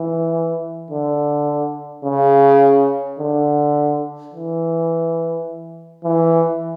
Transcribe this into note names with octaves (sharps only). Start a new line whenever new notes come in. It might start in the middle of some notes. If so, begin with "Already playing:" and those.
Already playing: E3
D3
C#3
D3
E3
E3